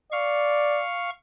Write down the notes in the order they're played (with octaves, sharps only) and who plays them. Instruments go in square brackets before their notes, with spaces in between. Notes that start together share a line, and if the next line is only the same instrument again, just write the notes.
[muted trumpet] D5 [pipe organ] F5 C#6